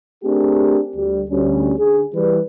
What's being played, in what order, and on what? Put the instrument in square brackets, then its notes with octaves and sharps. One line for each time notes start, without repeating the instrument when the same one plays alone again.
[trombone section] A3 C4 D4 G4 G#4 A#4
D2 G3
D2 G3 C#4
D3 G#4
E3 G3 B4